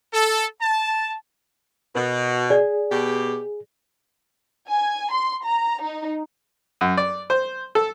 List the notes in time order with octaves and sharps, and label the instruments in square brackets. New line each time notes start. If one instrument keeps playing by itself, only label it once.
[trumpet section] A4
A5
[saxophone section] B2 [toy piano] A#4
[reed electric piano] G#4 [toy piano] D5
[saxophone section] B2 G4
[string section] G#5
C6
A#5
D#4
[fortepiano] F#2
D5
C5
A4